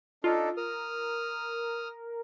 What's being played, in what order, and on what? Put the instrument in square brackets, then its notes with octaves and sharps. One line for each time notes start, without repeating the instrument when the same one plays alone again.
[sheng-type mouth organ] D4 D#4 A4 [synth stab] F4
[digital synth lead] A#4 [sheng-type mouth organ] D#6 F6